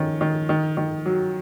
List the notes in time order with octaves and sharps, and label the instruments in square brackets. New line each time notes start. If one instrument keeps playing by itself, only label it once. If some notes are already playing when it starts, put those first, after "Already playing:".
Already playing: [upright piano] D#3 C#4
D#3
D#3
D#3
F#3